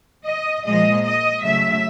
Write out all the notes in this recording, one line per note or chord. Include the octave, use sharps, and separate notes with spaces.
D#5
A#2 F3 G#3 D#5
D#5
C#3 F#3 A3 E5